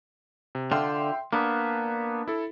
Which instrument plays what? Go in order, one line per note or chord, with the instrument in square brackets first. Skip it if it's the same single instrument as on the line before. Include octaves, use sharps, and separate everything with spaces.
[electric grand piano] C3
[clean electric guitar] D3 F4 [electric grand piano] E5 G5 C6
[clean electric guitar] A#3 B3 [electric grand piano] D4
[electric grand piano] E4 A4